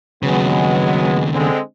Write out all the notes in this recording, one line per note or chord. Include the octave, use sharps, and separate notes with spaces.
D#2 C#3 F#3 G#3 B3
D3 G#3 C4